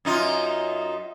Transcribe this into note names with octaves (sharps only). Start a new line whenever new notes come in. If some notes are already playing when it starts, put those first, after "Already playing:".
F#2 D#4 F4